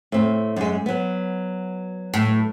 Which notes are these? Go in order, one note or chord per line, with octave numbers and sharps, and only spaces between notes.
A2 C4
F#2 G#3
F#3 B3
A2